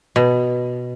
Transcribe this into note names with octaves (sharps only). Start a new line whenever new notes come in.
B2